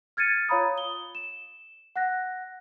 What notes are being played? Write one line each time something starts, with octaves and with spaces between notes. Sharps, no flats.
F6 G#6 A6 C#7 D#7
F4 C#5 F5 A#5 B5 D#6
G7
E7
F#5 F#6 A#6